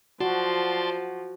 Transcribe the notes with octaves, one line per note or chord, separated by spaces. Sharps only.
F3 F#4 D5 A5 C6